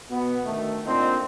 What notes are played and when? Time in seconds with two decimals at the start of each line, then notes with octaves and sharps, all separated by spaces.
0.11 B2 B3
0.44 D2 D#3 A3
0.85 A#2 D3 C4 D#4